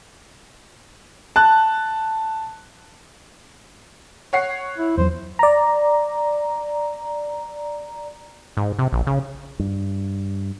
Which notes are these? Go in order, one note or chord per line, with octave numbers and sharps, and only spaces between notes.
A5 F#6
C#5 F#5 C7
E4
E2 F#3 C5
D5 A#5
G#2
C3
A#1
C#3
G2